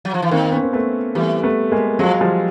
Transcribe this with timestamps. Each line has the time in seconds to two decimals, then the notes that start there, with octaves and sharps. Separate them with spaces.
0.05 F#3
0.14 F3
0.22 E3
0.31 D#3 A#3 C4
0.52 B3 C#4
0.62 C4
0.73 A3 B3
1.15 E3 G3 A3
1.43 A3 B3
1.72 G#3 A#3
1.99 F3 F#3 G#3
2.20 F3 G3